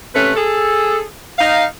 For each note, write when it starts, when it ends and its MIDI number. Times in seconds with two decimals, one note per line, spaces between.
0.15 0.34 48
0.15 0.34 57
0.15 0.34 61
0.15 0.34 71
0.35 1.02 68
0.35 1.02 69
1.38 1.64 63
1.38 1.64 77